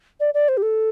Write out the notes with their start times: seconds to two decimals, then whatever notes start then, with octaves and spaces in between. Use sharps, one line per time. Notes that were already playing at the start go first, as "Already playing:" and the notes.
0.20 D5
0.34 D5
0.48 C5
0.57 G4
0.62 A4